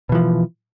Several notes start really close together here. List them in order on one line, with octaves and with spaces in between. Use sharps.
B2 E3 F3